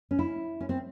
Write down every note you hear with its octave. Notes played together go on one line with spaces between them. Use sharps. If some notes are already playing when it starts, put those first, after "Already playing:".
C#4
E4
C#4
C4